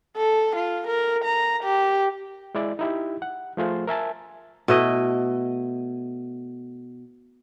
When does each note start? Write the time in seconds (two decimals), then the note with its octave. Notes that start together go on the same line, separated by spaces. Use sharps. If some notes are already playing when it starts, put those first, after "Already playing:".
0.17 A4
0.56 F4
0.87 A#4
1.24 A#5
1.63 G4
2.55 G#3 E4 D5
2.79 D#4 E4 G4
3.22 F#5
3.57 F3 A3 F4 G#4 C5
3.87 A#4 E5 G#5 A5
4.68 B2 A3 E4 D#5